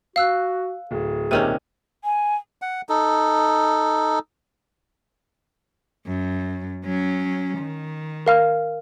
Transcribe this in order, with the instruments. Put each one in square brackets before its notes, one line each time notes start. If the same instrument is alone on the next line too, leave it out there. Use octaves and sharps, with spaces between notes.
[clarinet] F#4 [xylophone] F5 E6 F#6
[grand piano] D1 [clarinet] G#4
[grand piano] D#1 C2 D#7 [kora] C3 D#3 C#4
[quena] G#5
[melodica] F#5
D#4 A4
[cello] F#2
F#3 C#4
D#3
[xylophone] A#4 F5 F6